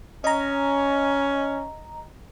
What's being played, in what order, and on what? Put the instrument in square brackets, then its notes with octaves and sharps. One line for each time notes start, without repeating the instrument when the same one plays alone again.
[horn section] C#4 [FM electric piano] D#5 A#5